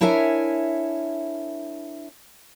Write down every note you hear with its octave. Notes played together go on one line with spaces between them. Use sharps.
D4 E4 A#4 C#5 E5 G#5